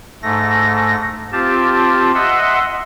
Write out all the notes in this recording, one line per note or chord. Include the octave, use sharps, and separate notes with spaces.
G#2 A3 A#6
C4 F4 G4 A5
D#5 E5 F#5 C6 E6